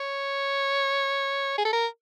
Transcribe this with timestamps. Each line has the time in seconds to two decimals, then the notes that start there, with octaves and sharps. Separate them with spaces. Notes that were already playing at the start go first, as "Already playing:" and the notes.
Already playing: C#5
1.58 G#4
1.65 A4
1.73 A#4